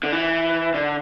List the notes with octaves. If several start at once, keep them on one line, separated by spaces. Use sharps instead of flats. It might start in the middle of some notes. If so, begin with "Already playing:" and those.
D3
E3
D3